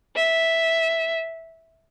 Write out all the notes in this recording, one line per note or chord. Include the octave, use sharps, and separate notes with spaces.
E5